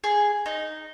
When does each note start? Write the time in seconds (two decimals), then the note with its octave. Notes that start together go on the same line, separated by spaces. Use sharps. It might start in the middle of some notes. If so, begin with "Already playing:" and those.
0.04 G#4
0.46 D#4